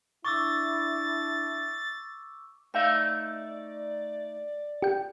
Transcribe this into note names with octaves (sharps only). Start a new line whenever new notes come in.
D4 E4 C#6 D6 E6 A6
A3 D#4 D5 E5 F5
G4 G5